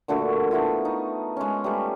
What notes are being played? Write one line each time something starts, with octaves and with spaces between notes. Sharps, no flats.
A#2 D3 A3 F#4
A3 B3 E4 F4
D#4
G#3 C#4
G3 A3 B4